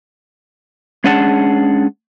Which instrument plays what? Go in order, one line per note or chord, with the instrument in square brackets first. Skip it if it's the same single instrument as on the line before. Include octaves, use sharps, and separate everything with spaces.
[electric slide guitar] G#3 C#4 D4 G#4 F#5 A5